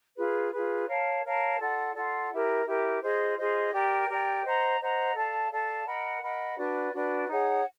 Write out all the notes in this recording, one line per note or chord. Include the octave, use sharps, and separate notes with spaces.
F4 G#4 B4
F4 G#4 B4
A#4 C#5 F5 A5
A#4 C#5 F5 A5
F4 A4 D5 F#5
F4 A4 D5 F#5
E4 G4 A#4
E4 G4 A#4
F4 G#4 C5 D#5
F4 G#4 C5 D#5
G4 A#4 D5 G5
G4 A#4 D5 G5
C5 D#5 F#5 A#5
C5 D#5 F#5 A#5
A4 D5 F5 A5
A4 D5 F5 A5
A#4 D#5 F#5 B5
A#4 D#5 F#5 B5
D4 F#4 B4 D5
D4 F#4 B4 D5
D#4 G#4 C#5 F#5